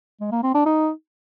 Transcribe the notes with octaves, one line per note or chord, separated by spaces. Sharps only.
G#3
A#3
C4
D4
D#4